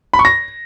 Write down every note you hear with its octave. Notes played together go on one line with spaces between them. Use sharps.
B5
C#6
A#6